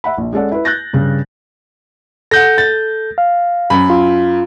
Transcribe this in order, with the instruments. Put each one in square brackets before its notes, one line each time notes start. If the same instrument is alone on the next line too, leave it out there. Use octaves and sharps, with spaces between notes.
[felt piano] E5 F#5 B5
A#1
G#3 C#4 A4 D5 F#5
E4 B4
F#6 G6 A6 A#6
G2 C#3
[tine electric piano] A4 G6 [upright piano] F#5 A#6
[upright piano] A6
[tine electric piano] F5
[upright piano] F#2 B5
[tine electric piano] F4